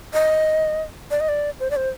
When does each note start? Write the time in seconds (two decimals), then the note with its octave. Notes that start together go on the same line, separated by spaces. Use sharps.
0.14 D#5
1.11 D5
1.20 D#5
1.29 D5
1.60 C5
1.71 D5
1.76 C5